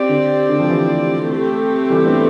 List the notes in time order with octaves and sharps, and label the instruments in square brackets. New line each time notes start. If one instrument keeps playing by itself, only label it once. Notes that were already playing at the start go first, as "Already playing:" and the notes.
Already playing: [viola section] C4 G4 D5
[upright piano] D3
D3
F3
E3
[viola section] A3 C4 G4
[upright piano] E3 G3
B3 D4